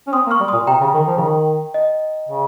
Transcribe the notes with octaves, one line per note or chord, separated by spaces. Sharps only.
C#4
C4 C6 D#6
A#3
C#6 F6
G3
A#2 C6 D#6
C3 G5 A#5
C#3
D#3
F3
C#3
D#3
D#5
C#3